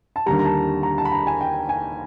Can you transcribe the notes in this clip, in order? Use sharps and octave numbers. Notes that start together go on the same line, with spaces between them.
A5
D#2 D3 G3 A#5
A#5
A5
A#5
A5
B5
A#5
G#5
G5
G#5